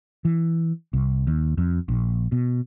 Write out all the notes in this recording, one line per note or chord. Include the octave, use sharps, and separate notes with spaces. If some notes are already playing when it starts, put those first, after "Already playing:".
E3
C2
D#2
F2
A#1
B2